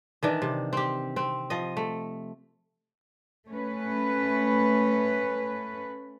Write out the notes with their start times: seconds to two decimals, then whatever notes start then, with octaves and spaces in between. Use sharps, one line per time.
0.23 D#3 E3 D4
0.42 C3
0.73 C4 G4
1.16 C4
1.50 F3 D#5
1.77 A3
3.50 A3 C#4 B4